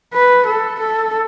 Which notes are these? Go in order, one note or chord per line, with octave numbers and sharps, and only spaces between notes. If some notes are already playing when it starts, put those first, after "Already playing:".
B4
A4
A4